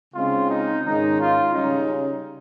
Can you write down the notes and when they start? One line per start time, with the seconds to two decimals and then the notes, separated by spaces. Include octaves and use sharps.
0.14 C#3 G#3 C4 D#4 F4
0.48 D#4
0.84 G#2 D#3 G#3 C#4 D#4
1.19 F4
1.52 C#3 G3 C#4 D#4